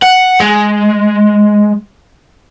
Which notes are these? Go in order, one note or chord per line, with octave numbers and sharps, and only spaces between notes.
F#5
G#3